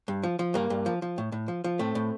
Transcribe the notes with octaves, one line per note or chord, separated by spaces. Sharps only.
G2
F3
F3
G2 A#3
G2
F3
F3
A2
A2
F3
F3
A2 A3 C4
A2